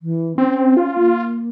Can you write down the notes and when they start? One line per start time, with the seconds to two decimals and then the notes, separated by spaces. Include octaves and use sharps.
0.02 E3
0.38 C4 C#4
0.77 F4
1.00 A#3